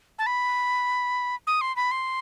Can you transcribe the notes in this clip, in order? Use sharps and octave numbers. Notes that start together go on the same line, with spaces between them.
A5
B5
D#6
C6
B5
C6